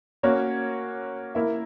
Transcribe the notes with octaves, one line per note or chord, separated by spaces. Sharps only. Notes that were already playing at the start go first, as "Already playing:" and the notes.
A#3 C#4 F#4 C#5
A#3 E4 A#4 E5